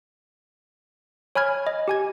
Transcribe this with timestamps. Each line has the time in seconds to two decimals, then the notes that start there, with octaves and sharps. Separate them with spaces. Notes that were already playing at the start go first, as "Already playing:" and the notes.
1.35 C#5 G#5 B5 F6 G#6
1.67 D#5
1.88 G4 G#5 G#6